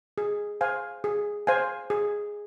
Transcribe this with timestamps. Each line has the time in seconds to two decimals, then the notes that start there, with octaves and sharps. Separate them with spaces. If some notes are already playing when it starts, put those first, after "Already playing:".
0.18 G#4
0.61 C5 F5 G#5
1.04 G#4
1.47 C5 F5 G#5
1.90 G#4